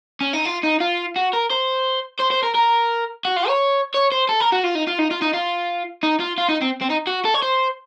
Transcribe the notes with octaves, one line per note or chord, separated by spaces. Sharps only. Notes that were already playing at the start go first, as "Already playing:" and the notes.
C#4
D#4
F4
D#4
F4
F#4
A#4
C5
C5
C5
A#4
A#4
F#4
F4
C#5
C#5
C5
A4
A#4
F#4
F4
D#4
F4
D#4
F4
D#4
F4
D#4
F4
F4
D#4
C4
C4
D#4
F#4
A4
C#5
C5